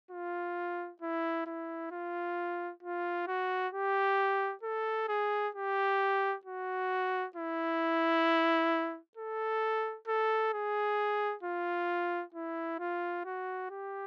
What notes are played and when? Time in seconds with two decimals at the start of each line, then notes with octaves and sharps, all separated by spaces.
0.11 F4
1.02 E4
1.46 E4
1.92 F4
2.83 F4
3.27 F#4
3.73 G4
4.63 A4
5.09 G#4
5.55 G4
6.46 F#4
7.36 E4
9.17 A4
10.08 A4
10.53 G#4
11.43 F4
12.34 E4
12.79 F4
13.25 F#4
13.71 G4